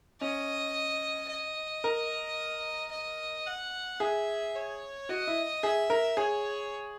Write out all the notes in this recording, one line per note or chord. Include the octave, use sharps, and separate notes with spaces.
C#4 D#5
D#5
A#4
D#5
F#5
G#4 E5
C#5
F#4 D#5
E4
G#4 E5
A#4
G#4 C#5